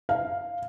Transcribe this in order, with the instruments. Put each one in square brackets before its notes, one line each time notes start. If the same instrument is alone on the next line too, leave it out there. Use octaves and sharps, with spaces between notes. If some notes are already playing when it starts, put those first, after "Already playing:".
[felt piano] F5